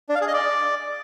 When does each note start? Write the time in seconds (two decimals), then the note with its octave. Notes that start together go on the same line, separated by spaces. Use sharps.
0.09 D4
0.15 F5
0.21 G#4
0.27 D#5
0.34 D5